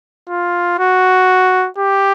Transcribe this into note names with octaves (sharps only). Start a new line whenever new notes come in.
F4
F#4
G4